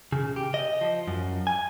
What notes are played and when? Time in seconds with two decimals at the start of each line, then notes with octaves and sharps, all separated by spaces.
0.12 C#3
0.36 G4
0.54 D#5
0.81 F3
1.07 F#2
1.47 G#5